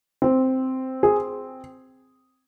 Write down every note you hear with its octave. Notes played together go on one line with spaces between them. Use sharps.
C4
G#4